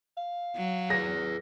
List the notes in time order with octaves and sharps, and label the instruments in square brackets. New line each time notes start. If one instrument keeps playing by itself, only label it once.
[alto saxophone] F5
[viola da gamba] F#3
[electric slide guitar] G#4 B4 [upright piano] A#6